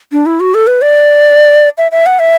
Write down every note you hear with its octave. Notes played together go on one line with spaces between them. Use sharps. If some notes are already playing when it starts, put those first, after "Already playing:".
D4
E4
F#4
A4
B4
D5
E5
E5
F#5
E5